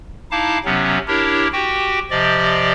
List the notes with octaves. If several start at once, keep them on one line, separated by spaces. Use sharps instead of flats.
D#4 E4 F5 A5 D6
C3 F#3 B3 C#4
D4 E4 G4 A#4 C#5
F#4 G4 G5
C3 F3 G4 D5 D#5